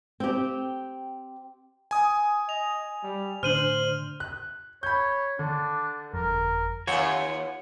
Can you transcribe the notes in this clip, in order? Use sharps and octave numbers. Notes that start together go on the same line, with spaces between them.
C4 G4
G#5 D#6
D#5 F7
G3
A2 D3 D4 C5 F6 D#7 F#7
F#6
C#5 B5 G6
D3 D4
G1 F2 A#4
D#2 F4 C#5 F#5 G#5